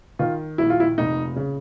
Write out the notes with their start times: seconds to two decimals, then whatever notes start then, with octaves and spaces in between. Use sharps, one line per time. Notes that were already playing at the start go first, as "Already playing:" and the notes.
0.19 D#3 F4
0.58 A#1 E4
0.70 F4
0.80 E4
0.98 F1 D#4
1.36 C#3